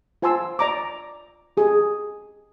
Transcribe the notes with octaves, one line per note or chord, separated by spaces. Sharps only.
F4 C5 G#5 A5 C6 E6
D5 A#5 D6
G4 G#4 G#5